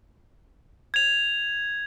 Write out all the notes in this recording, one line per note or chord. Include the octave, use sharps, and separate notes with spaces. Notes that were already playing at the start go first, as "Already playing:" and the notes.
G#6 F7